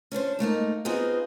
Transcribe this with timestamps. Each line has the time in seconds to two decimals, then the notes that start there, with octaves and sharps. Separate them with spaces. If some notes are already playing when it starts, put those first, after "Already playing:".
0.12 C#4 D4 B4 C5
0.39 G#2 A3 A#3 D#4
0.85 B3 C4 D#4 F4 F#4 G#4